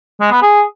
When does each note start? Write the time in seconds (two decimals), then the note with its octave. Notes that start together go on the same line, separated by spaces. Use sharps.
0.20 G#3
0.31 B3
0.42 G#4